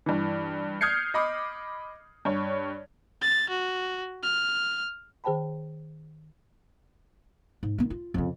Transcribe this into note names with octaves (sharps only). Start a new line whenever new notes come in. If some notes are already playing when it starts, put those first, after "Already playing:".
G2 E3
D#6 F6 G6 G#6 C7 C#7
D#5 B5 D6
G2 C#5
A6
F#4
F6
D#3 G#4 C5 G5 A5 B5
G#2
D#3 B3
F4
F2 C#3